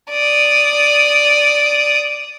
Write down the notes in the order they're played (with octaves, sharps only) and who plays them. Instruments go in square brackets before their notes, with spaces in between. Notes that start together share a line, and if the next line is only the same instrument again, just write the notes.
[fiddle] D5 D#6